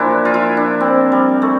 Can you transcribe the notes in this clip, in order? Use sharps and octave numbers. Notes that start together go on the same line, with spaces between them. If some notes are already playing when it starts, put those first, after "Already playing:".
Already playing: A#2 F3 D4 E4
F4
E4
D4
C4
G3
A3